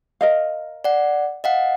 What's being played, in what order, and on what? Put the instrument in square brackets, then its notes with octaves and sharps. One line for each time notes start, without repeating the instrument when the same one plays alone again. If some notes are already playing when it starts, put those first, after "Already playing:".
[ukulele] A#4 D#5 F5
[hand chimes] D5 F#5
D#5 F5 F#5